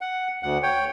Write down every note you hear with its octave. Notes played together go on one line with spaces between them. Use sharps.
F#5
D2 F#5
C#5 G5